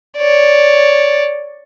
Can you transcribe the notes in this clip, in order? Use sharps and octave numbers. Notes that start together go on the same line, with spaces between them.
C#5 D5